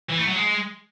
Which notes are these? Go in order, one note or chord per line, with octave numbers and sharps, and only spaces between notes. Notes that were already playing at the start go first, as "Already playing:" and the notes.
E3
A3
F#3
G#3